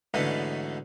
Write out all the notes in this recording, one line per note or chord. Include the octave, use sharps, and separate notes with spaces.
E2 G#2 B2 D3 A3 C#4